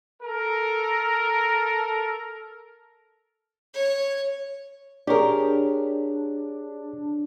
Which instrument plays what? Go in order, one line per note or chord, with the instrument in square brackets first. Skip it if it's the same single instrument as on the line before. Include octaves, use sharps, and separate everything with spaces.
[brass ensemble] A4 A#4
[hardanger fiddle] C#5
[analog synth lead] D4 [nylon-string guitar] G4 A#4 [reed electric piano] G#4 C#5 D5